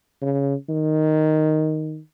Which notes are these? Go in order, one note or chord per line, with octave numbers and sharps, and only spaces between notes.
C#3
D#3